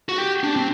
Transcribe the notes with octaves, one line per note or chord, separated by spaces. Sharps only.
F#4
G4
D4
C4